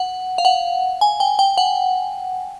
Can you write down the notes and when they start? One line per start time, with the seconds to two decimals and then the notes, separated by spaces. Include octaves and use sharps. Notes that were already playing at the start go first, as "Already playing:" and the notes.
Already playing: F#5
0.38 F5
0.45 F#5
1.01 G#5
1.20 G5
1.39 G5
1.57 F#5